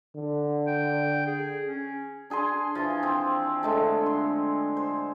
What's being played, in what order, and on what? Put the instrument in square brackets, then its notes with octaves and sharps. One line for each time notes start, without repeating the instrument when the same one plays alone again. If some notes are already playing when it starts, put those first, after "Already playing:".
[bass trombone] D3
[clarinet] G5
G#4
C#4
[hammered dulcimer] D4 G#4 G#5 C6
E3 F3
C4 C5
D3 G#3 A3
C6
C5